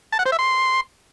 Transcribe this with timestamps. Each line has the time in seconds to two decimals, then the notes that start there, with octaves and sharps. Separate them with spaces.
0.12 A5
0.19 F#5
0.26 C5
0.32 E5
0.39 C6